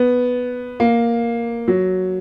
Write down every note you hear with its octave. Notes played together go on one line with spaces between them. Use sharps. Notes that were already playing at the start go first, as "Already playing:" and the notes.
Already playing: B3
A#3
F#3